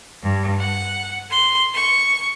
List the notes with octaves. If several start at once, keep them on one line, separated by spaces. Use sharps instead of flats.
G2
F#5
C6
C#6